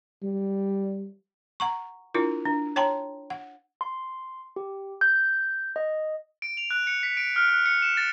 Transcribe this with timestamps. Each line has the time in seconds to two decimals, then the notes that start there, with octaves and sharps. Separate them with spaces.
0.23 G3
1.60 F#5 A#5 C#6
2.14 D4 E4 F4 A#4
2.45 D4
2.76 C#5 G5 A5 A#5 C6
3.30 F#5
3.81 C6
4.56 G4
5.01 G6
5.76 D#5
6.42 D7
6.57 F7
6.71 F#6
6.87 C#7
7.03 B6
7.17 D7
7.36 F6
7.49 F#6
7.66 C#7
7.82 E7
7.97 A6